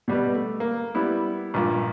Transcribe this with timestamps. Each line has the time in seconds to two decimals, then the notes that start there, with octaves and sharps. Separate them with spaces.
0.08 B2 G3 B4
0.35 A3
0.60 A#3
0.95 G3 B3 E4
1.54 A#1 G2 A#3 F4